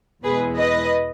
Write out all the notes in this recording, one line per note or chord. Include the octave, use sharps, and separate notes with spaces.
E2 B2 G#3 B3 E4 G#4 B4
B4 D#5